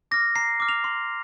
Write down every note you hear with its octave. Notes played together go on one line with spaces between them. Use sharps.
D6 F6 A#6
A#5 C7
D6 F6
F7
C6